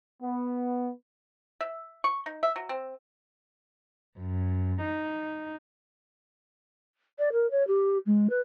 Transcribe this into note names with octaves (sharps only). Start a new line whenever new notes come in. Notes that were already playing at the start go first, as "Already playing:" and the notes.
B3
E5
C#6
D#4
E5
F#3
C4
F#2
D#4
D5
A#4
C#5
G4
G#3
B4